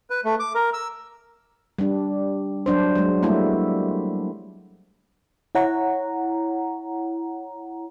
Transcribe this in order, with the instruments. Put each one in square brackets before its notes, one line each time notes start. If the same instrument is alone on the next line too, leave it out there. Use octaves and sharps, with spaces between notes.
[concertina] B4
A3
D6
A#4
E6
[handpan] G3 D4
F#3 D4 C5
F#3 G#3
G3 A3 A#3 E4
[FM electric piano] E4 C#5 F#5 A#5